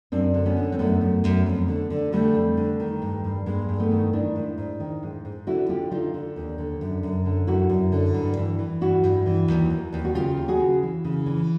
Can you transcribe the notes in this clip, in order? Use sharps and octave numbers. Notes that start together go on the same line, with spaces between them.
F#2 C4 D4
D3
B3 C#4
D3
C4
F#2 A3 B3
F#2
F#2
F2
D3
D3
D3 G3 A3
F2
D3
D#3
G2
G2
G2 G#3 A#3
G2
A3 B3
D#3
D#3 D4 E4
G#2
G#2
D#3
G#2
G#2
D3 E4 F#4
D3 F4 G4
D3 D#4 F4
D3
D#2
D3
F#2
F#2
D3
F#2 E4 F#4
F#2
D3
G2
E3
E3
G2 E4 F#4
G2
E3
D#2
E3
D#2
F#4
C#3 F4 G4
D#2
F#4 G#4
C#3
E3
C#3
E3